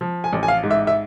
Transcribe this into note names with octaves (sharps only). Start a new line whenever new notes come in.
F3
G#5
A1
G#5
F5
G#2
E5
E5